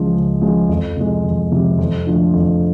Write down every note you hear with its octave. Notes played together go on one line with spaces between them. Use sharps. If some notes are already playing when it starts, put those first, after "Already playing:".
Already playing: C#2 C#3 F3 G#3
C#2
C#3 F3 G#3
F2
C3 F3 G#3
F2
C3 F3 G#3
F2
D3 F3 A3
F2